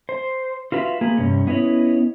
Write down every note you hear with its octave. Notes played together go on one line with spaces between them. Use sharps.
C5
F4 F#4 B4 E5 F5
A#3 G#4 B4
G2 C3 C#4
B3 C#4 E4 B4 C#5 D#5